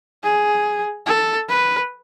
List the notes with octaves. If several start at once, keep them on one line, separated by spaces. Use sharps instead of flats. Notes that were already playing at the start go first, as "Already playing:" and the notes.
G#4
A4
B4